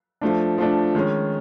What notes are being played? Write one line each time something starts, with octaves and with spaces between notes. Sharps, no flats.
F3 A3 D4
F3 A3 D4
D#3 G#3 C#4